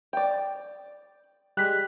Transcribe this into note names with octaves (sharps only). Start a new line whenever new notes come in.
D5 G5
G3 G#3 F#6 B6